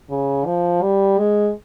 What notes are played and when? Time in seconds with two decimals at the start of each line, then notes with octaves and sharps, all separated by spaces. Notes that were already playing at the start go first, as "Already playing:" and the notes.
0.10 C#3
0.46 F3
0.82 G3
1.19 G#3